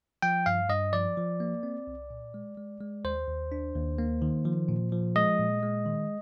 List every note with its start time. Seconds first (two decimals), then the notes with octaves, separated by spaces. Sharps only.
0.22 F3 G5
0.46 G2 F5
0.69 G2 D#5
0.93 F3 D5
1.17 F3
1.40 A#3
1.63 C4
1.87 C2
2.10 A#2
2.34 G#3
2.57 G#3
2.81 G#3
3.04 D#2 C5
3.28 D#2
3.52 D4
3.75 D#2
3.98 A#3
4.22 D#3
4.45 F3
4.69 A#2
4.92 F3
5.16 G#3 D#5
5.39 A#2
5.63 G#3
5.86 D#3